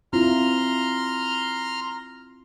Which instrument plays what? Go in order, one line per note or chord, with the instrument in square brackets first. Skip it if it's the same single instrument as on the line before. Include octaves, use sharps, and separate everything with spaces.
[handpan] C4 E4 F4 [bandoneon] A#5 C6 F6